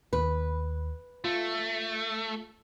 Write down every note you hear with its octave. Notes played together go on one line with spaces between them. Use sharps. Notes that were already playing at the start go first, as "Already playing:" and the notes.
D#2 B4
A3 F4